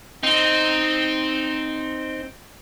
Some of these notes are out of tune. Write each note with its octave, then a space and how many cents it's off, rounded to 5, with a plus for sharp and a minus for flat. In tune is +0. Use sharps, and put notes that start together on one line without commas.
C4 +0 D#4 +0